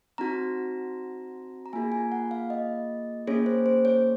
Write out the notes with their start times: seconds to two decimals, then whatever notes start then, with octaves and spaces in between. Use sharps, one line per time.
0.18 C4 D#4 F#4 A#5
1.66 A#5
1.73 A#3 F4 G#4 G#5
1.92 G#5
2.12 F#5
2.31 F5
2.50 D#5
3.27 A#3 C#4 G#4 C#5
3.46 C5
3.66 C5
3.85 C#5